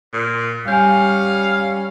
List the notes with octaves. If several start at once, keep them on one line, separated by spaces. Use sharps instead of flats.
A#2
G3 C#4 F5 G#5 G6